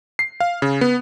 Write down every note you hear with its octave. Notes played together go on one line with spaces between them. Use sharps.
C7
F5
C#3
B3